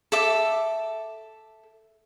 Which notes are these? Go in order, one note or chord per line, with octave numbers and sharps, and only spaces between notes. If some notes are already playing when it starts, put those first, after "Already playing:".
A4 E5 D6